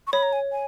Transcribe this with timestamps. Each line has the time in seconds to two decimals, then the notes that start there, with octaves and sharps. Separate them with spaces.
0.07 C#6
0.13 C#5 B5
0.23 A#5
0.33 G#5
0.52 G#5